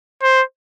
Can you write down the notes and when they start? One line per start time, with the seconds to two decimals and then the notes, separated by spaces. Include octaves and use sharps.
0.23 C5